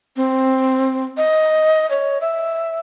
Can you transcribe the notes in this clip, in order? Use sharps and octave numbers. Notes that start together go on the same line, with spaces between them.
C4
D#5
C#5
E5